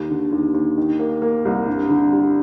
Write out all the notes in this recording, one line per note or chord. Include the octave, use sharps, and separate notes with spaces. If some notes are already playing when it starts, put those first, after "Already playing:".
Already playing: D#2
D3
D#2
D#2
D#3
A#3
A#3
C2
G2
D3
G3